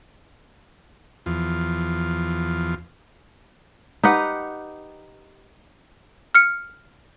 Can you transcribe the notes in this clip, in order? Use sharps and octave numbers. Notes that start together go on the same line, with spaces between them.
E2 F3
D#4 G4 B4 F#5
F6 C#7